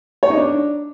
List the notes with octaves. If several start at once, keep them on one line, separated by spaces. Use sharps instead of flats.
C#5
D#4
D4